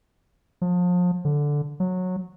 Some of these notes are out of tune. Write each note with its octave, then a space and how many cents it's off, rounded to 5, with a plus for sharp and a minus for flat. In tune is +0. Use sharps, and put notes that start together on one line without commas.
F3 +35
D3 -5
F#3 -15